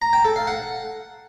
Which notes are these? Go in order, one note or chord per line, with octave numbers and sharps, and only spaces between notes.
A#5
G5
A4
F5
F#5